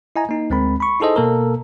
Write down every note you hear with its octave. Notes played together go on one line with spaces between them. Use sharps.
E4 D#5 G#5 A#5
A#3 D#4
D2 G#3 C4 A#4 B5
B5 C#6
D#4 E4 G#4 A4 C5 D#5
B2 A#3 A4 A#4